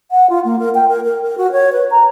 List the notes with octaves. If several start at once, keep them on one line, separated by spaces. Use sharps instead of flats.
F#5
F4
A#3
A#4
G5
A#4
A#4
A#4
F#4
C#5
B4
A#5